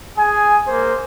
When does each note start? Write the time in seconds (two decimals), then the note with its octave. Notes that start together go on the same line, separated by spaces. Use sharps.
0.17 G#4 G#5
0.67 A#3 C5